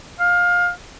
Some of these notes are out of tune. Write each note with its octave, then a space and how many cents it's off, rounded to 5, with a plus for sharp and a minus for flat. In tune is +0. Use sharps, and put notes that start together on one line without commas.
F5 +20